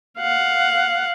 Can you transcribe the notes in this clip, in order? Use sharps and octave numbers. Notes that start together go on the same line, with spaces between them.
F5 F#5